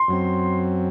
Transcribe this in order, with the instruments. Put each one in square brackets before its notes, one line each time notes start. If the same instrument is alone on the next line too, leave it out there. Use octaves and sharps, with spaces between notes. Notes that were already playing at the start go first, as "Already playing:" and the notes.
Already playing: [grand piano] C6
[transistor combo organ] F#2 F#3 C4